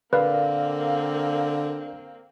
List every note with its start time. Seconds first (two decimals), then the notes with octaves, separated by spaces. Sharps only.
0.13 D3 A#3 C4 A#4 B4 D5 F5